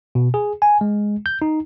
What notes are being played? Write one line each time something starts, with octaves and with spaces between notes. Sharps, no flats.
B2
G#4
G#5
G#3
G6
D#4